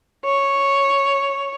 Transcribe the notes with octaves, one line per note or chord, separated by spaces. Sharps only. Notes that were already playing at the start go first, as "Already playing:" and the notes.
C#5